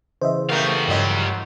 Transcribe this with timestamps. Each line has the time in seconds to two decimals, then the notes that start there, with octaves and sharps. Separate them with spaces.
0.21 C#3 E3 C5 D#5 E5
0.49 A3 B3 G4 A#4 F5
0.88 G2 F#3 F4 D#5